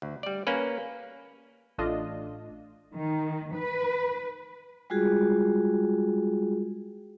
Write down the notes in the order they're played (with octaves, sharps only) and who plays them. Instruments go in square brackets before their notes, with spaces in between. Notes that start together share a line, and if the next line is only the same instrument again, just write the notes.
[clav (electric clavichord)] D2
G3 D5
A#3 C#4 B4
[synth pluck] A1 A3 D4 F4 D#5
[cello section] D#3
B4
[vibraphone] G3 G#3 F4 F#4 G#4